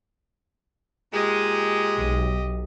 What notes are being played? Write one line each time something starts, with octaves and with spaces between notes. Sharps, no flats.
A#2 G#3 G4 D#5
B1